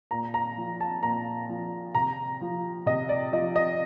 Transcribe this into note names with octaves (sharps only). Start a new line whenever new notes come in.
A#2 A#5
A#5
F3
A5
A#2 A#5
F3
C3 A#5
F3
C3 D#5
D5
F3 D#5
D#5